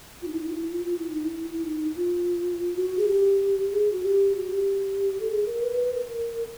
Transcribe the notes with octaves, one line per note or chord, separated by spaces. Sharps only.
F4
D#4
E4
D#4
F4
E4
F4
F4
E4
D#4
E4
E4
D#4
F4
F#4
G#4
G4
G#4
F#4
G4
F#4
G4
A4
G#4
A#4
B4
B4
A#4